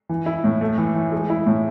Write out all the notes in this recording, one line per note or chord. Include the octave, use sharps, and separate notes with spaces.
E3
E4
A2
A3
E3
E3
G#3
E4
A2